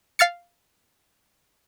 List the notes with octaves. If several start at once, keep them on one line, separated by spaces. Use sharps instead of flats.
F5 F6 A6 C#7